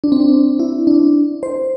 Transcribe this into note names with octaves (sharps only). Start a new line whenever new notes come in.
D4
C4
D4
E4
D4
C5